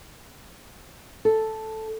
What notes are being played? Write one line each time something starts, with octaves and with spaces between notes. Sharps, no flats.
A4